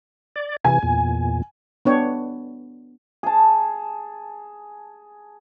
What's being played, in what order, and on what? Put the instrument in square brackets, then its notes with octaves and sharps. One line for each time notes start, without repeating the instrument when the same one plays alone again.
[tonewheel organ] D5
[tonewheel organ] C3 E3 [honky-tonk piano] G#5
[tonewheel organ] E2 A#2
[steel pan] B3 D4 C#5 G5
[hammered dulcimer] G#4 A5